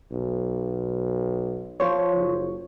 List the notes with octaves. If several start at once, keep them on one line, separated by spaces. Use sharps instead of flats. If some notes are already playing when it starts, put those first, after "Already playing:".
B1
F3 F4 C5 C#5
F#1